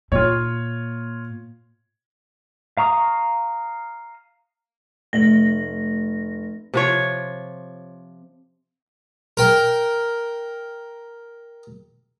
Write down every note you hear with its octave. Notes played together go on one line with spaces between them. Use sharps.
A#2 F4 C#5
F5 A#5 C#6 D#6
F1 A3 E5 A#6 F#7
C3 F3 C#5
A#4 G5